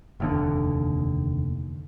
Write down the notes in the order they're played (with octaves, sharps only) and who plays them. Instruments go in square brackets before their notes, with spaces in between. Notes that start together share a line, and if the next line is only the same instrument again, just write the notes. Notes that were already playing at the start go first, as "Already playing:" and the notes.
[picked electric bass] F1 D#2 D3